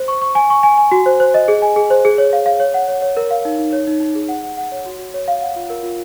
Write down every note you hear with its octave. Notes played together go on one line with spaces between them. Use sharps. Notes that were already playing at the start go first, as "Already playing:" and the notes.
Already playing: C5
C#6
C#6
G#5
C#6
G#5
G#5
F#4
C5
C5
D#5
G#4
G#5
G#4
C5
G#4
C#5
F5
F5
C#5
F#5
C#5
C#5
A#4
F5
D#4
D#4
C#5
D#4
D#4
G#4
F#5
F#5
F#5
C#5
F#4
F#4
C#5
F5
F#5
F4
A#4
F4